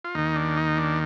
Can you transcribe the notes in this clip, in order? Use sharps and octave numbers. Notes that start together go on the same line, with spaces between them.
F4
D#2 D#3 D#4
D4
D#4
D4